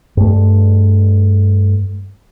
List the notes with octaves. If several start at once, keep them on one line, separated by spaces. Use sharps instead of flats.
G2 A3